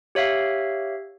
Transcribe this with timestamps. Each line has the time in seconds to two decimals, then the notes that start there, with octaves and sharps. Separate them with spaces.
0.15 G4 C#5 E5 F5